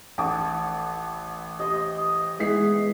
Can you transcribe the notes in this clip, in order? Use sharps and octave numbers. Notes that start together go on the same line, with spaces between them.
A1 F#5 A5 D6 D#6
G4 C5 D#5
E3 G#3 B3 B4 B6 C7